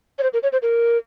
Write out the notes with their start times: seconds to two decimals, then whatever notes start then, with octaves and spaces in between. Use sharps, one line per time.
0.19 C#5
0.23 C5
0.33 A#4
0.43 C#5
0.52 C5
0.62 A#4